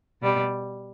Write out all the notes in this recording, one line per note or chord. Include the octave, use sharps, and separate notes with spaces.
B2 G3